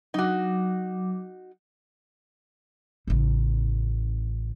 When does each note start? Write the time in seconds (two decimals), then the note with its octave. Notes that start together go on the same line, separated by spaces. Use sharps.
0.14 F#3 D#4 F#4 D6
3.07 A1 C#3